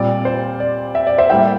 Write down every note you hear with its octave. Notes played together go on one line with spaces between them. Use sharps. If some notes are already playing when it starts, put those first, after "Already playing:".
Already playing: A#2 G3 C4 D5
C5
D5
E5
D5
C5 E5
A2 G3 A#3 E5 G5